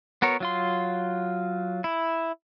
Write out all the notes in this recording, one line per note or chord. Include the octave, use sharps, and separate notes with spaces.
B3 F#4 A#4 C#5
F#3 F4 C6
E4